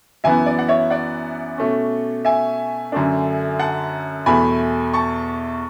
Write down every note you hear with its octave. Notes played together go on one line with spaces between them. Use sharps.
F#2 E3 B3 E4 E5 G#5
D5
F#5
C#5 E5
D5 F#5
B2 A3 C#4
E5 G#5
F#2 D3 A3 D4
F#5 A5
E2 B2 A3 G#5 B5
A5 C#6